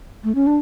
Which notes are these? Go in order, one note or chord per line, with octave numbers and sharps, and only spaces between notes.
A3
C#4
D4